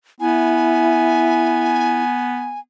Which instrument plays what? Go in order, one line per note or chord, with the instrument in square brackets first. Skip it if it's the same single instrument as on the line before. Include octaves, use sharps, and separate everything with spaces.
[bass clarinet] B3 [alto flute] E4 [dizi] G#5